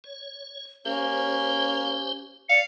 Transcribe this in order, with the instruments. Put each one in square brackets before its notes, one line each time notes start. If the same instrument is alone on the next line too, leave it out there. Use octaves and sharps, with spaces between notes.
[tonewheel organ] C#5
[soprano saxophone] A#3 [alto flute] C#4 [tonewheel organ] G4 C5
[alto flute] D5 [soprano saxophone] F5 [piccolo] C#7